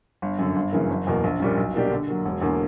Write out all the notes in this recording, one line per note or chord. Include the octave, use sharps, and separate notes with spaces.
G1
F#2 D3
G1
F#2 C#3 E3 A#3
F#1
E2 B2 A#3
A#1
A#2 G3 C#4
B1
B2 A#3 D4 G4
D3
F#3 A#3
E1
E2 D3 A#3